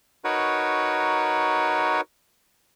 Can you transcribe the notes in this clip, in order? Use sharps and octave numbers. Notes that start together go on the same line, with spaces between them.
D#4 F#4 A#4 B4 C#5